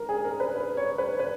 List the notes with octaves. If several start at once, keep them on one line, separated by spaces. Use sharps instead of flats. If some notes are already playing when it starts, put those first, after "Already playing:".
Already playing: A#4
G#4
A#4
B4
B4
C#5
B4
B4